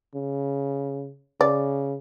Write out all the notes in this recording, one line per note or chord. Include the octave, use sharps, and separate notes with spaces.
C#3
C#3 D5